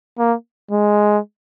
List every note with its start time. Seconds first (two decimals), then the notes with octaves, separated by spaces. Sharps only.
0.19 A#3
0.71 G#3